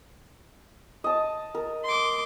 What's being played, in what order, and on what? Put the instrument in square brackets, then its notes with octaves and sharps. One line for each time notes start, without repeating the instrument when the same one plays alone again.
[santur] D#5 A5
A#4
[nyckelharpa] C6 D6